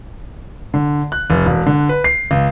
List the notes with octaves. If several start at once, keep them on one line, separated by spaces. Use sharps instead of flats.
D3
F#6
F1
E1
D3
B4
C7
C#2